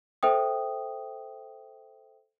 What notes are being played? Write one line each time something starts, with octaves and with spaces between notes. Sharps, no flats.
A4 C5 E5 G5 D#6